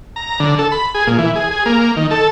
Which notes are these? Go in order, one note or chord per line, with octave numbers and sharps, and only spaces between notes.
A#5
D3
A4
B5
G#4
A#2
E3
G#4
G#4
A#3
D#3
A4